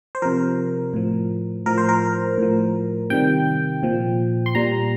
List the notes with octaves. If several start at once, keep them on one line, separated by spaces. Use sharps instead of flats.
C5
C3 F3 A#4
A2 F3
A2 F3 A#4
C5
A#4
A2 F3
C3 D#3 G3 G5
A#2 F3
C6
A#2 G3 A#5